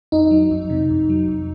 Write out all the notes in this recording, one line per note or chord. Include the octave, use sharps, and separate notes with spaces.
F2 D#4
F#3
F2
C3
F2
F#3
F2